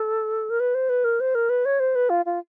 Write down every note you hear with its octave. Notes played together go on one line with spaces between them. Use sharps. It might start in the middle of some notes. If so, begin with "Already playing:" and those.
Already playing: A4
A#4
B4
C5
B4
A#4
C5
A#4
B4
C#5
C5
B4
F4
F4